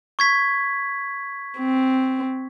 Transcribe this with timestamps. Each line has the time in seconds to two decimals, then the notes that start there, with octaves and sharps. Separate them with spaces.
0.19 C#6 G#6 B6
1.59 C4